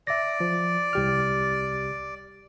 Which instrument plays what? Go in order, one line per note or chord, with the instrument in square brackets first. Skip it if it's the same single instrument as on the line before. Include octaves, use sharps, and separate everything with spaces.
[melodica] D5 [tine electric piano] E5 A#6
[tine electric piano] F3
C2 G4 F6